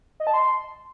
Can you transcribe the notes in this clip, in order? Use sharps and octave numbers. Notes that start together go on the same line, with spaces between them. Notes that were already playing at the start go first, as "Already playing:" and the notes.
D#5
A5
C6